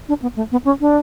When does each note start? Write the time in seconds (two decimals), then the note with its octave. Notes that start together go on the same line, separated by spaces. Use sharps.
0.08 D4
0.22 B3
0.36 A3
0.52 B3
0.65 C#4
0.80 D4